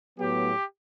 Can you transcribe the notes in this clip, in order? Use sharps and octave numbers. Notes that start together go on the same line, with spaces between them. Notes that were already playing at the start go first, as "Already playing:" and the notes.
A2 F#3 B3 G4